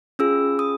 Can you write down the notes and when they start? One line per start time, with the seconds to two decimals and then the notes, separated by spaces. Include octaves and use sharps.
0.19 C#4 F4 G#4 E6
0.59 D#6